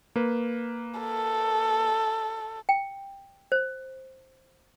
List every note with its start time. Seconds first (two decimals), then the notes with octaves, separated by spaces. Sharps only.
0.16 A#3 B4
1.00 A4
2.69 G5
3.52 C5